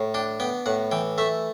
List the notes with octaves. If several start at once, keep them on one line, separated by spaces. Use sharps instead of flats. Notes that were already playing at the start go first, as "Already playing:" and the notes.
Already playing: A2
D4 G5
B3 G5
A2 F#5
E3 G5
A3 E5